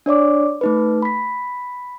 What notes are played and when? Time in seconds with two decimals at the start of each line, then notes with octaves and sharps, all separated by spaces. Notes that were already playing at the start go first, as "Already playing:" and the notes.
0.06 D4 C#5 D5 D6
0.61 A3 D#4 B4
1.02 B5 B6